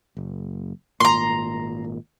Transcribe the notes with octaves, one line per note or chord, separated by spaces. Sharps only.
F#1
G#1 A#2 A#5 C6